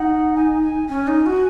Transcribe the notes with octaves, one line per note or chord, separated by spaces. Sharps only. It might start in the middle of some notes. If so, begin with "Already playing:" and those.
Already playing: D#4 F#5
G#5
G#5
C#4 G#5
D#4
F#4